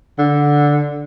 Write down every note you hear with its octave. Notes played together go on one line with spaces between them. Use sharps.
D3